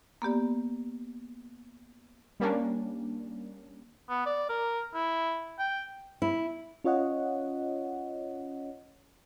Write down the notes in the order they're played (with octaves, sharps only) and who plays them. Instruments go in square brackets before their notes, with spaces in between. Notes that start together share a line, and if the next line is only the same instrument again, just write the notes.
[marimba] A#3 B3 G4 D5
[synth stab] G3 A#3 C#4 D4
[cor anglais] B3
D5
A#4
E4
G5
[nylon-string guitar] E4
[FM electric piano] C#4 F4 C#5 D#5 F#5